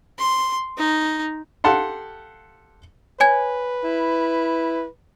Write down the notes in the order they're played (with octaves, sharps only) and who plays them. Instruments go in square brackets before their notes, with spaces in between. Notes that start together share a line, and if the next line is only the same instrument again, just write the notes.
[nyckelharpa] C6
D#4
[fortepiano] G4 A4 F5 F#5 A5 C6
[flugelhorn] B4 [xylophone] C#5 G#5 G#6
[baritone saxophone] E4